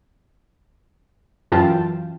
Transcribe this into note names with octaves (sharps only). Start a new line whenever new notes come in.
F#2 E3 F4 G5 A5